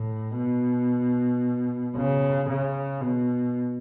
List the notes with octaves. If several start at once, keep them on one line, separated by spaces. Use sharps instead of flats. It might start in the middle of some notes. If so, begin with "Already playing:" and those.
Already playing: A2
B2
C#3
C#3
B2